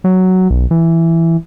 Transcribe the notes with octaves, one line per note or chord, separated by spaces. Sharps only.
F#3
B1
E3